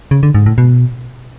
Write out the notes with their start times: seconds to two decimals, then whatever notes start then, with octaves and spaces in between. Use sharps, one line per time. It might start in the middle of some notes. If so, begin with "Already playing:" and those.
0.11 C#3
0.23 D3
0.34 G#2
0.46 A2
0.58 B2